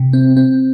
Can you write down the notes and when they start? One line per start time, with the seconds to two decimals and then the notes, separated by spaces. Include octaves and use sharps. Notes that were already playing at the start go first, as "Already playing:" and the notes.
Already playing: C3
0.13 C4
0.37 C4